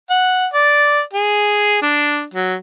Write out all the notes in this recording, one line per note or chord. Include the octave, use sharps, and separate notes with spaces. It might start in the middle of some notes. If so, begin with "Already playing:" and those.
F#5
D5
G#4
D4
F#3